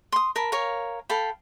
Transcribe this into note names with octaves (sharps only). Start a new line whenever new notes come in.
C6 D#6
A#4 A5 B5
A#4 C#5 F5 G#5
A4 F5 G5 B5